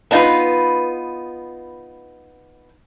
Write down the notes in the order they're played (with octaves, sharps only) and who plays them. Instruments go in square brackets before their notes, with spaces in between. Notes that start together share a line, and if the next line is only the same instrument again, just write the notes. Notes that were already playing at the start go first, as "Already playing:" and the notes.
[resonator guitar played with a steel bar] B3 D4 D#4 F4 B4